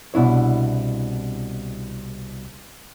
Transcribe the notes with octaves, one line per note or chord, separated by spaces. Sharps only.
C2 B2 D4 E4 C#5